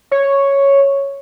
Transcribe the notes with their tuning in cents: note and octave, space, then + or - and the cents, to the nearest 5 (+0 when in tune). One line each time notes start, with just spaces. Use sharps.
C#5 +0